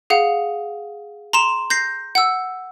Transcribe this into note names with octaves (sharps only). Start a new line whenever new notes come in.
G#4 F5 F#5
A#5 C6 E7 F7
G6 A#6 C7
F#5 E6